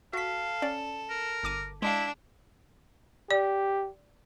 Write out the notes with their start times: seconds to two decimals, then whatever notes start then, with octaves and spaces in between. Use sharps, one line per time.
0.13 F#4 A4 F5 B6
0.62 C#4 D5
1.10 A#4
1.43 G1 D6 D#7
1.82 G#3 D4 E4 F5
3.31 G4 D5